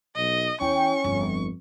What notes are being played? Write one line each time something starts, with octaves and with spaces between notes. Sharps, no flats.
B1 D#5
E2 C#4 E4 C#5 G5 C#6
G1 F2